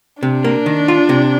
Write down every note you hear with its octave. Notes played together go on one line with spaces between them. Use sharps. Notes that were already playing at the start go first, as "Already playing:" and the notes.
C3 D4
A#3
D#3
F4
C3